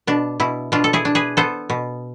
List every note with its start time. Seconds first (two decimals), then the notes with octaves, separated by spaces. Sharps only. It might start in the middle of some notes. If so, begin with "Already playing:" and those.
0.07 B2 D4
0.40 B2 E4
0.72 B2 D4 F4
0.84 A4
0.93 E4 G#4
1.05 D4
1.15 G#4 B4
1.37 B3 A4 C5
1.70 B2